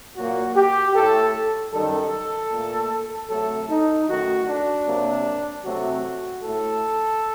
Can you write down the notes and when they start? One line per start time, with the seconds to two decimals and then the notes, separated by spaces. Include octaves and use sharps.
0.15 A#2 F#3 A#3 F#4
0.55 G4
0.94 A2 A3 A4
1.72 F#2 D#3 G3 A4
2.51 A#2 A3
3.28 C3 F#3 A3 A4
3.68 D#4
4.07 F#2 D#3 A3 F#4
4.46 D4
4.85 C3 F#3 A#3
5.64 C3 F#3 A3 F#4
6.42 A2 A3 A4